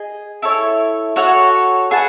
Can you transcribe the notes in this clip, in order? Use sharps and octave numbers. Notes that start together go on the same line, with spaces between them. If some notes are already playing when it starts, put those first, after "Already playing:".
Already playing: G#4 D#5 G#5
E4 A4 C#5
F#4 A4 C#5 F#5
G#4 B4 F#5 A5